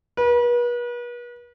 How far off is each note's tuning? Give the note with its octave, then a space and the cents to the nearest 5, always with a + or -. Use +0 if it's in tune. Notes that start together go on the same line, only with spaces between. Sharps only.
B4 -40